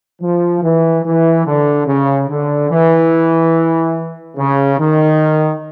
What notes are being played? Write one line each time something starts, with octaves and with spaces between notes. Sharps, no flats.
F3
E3
E3
D3
C#3
D3
E3
C#3
D#3